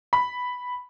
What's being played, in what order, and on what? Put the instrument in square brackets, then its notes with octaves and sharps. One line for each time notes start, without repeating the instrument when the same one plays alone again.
[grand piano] B5